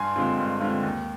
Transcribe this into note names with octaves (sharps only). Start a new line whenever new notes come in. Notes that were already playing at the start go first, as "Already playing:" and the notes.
Already playing: G2 G#5 C6
D3 G#3 C4 F4
G2
D3 G#3 C4 F4
D#2